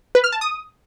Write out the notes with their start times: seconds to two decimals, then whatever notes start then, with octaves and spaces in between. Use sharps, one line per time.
0.15 B4
0.24 F6
0.32 A5
0.41 D#6